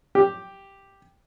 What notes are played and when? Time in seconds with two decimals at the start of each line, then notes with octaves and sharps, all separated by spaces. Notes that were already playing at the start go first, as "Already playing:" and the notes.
0.15 G4